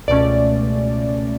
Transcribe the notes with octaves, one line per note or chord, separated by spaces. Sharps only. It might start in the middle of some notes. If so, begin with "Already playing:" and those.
C#2 B2 A3 C#4 D5